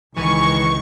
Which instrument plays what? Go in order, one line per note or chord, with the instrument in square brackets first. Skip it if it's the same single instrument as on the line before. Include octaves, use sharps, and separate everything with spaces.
[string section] C#2 D#3 C#6 [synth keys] E3 G#5